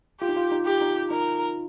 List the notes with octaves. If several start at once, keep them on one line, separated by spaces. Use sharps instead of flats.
F4 G4
D#4
F4
D#4
G4
D#4
D#4 A#4